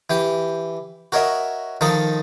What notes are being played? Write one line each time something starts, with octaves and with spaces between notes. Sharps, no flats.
E3 G4
F#4 A#4 C#5 D#5 E5
D#3 F3 D#4 A4